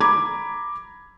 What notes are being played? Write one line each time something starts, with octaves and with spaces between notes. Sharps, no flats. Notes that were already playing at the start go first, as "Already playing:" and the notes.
A#5 B5 D6 G#6